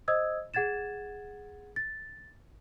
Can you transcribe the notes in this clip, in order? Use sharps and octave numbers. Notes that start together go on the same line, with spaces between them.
C5 D#5 D#6 E6 G#6
G#4 F#5 G#6 A6 E7
A6